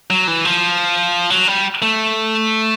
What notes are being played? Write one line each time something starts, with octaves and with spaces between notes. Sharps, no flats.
F#3
E3
F3
F#3
G3
A3